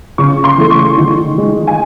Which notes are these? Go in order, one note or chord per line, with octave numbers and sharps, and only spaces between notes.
C#3 C#6
C6
E3 A3
C#6
D#3
G#3
G#5